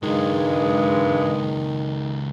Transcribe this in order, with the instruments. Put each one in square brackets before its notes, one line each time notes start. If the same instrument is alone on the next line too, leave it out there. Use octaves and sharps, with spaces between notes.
[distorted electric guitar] C#2 F#3 [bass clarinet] G2 [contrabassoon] D#3 [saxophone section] G#3